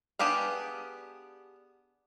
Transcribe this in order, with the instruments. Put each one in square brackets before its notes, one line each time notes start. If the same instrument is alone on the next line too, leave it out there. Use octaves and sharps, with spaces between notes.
[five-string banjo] B3 D4 G4 G#4 F5